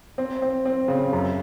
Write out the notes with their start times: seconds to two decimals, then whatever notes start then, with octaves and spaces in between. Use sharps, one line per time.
0.18 C4
0.42 C4
0.65 C4
0.88 C#3
1.13 F#2